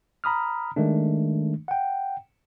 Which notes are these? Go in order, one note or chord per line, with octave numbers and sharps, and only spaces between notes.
A#5 B5 D#6 F6
D#3 G#3 A3 D4
F#5 G5